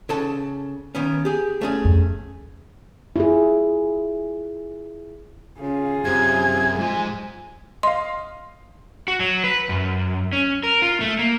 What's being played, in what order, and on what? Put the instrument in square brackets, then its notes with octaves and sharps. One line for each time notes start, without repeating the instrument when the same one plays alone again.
[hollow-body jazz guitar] C#3 A4 A5
D#3 B3 C#4
G4 G#4
A3 C#4 G#4
[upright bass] F2
[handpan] E4 F4 G#4
[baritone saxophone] C#3 [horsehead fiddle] F4 G#4
[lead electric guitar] F#2 [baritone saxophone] C3 [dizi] G#6
[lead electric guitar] G#2 G#3 [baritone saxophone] F3 [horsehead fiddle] G#5
[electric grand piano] D#5 F5 [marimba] C6
[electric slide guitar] F#4
F#3
B4
F#2
C#4
A#4
F4
A3
A#3